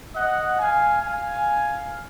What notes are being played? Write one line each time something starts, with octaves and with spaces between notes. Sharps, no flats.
D#5 F#5
F5 G#5
F5 G#5